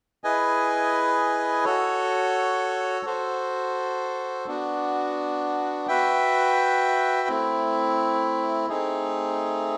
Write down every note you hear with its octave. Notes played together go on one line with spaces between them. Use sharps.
E4 G#4 B4 D#5 G#5
F#4 A4 C#5
F#4 A4 C5
B3 D4 F#4
F#4 B4 E5 G5
A3 C4 E4
A3 C4 D#4 G#4